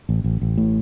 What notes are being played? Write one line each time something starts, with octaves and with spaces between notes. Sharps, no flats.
A1
A1
A1
A2